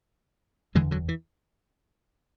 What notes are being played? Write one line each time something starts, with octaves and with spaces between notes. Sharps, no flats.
F#1 E2 D3 E3 G#3
D3 F#3
E3